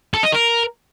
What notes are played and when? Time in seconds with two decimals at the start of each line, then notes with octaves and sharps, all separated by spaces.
0.14 A4
0.23 D#5
0.32 A#4